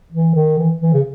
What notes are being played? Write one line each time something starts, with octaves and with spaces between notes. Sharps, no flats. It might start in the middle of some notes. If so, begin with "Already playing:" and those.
E3
D#3
E3
E3
C#3